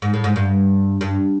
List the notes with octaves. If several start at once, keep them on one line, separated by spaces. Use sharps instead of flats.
G#2
A2
G#2
G2
G2